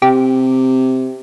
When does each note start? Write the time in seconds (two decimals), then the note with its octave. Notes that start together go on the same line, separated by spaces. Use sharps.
0.02 C3 G4